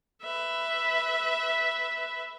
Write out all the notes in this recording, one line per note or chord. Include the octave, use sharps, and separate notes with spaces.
B4 E5